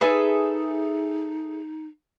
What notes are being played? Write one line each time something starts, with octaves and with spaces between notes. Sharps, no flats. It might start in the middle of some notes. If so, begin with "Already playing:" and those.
D#4 G#4 A4 B4 E5